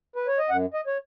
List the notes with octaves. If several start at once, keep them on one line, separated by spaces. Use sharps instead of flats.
B4
C#5
D#5
F#2 F#5
D#5
C#5